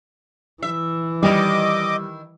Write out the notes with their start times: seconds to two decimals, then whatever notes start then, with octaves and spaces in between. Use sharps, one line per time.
0.62 E3 E5
1.23 D#3 G3 E4 D#5 D6